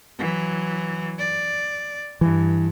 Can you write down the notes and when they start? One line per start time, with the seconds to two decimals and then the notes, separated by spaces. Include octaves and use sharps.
0.18 E3 F#3
1.19 D5
2.21 G2 E3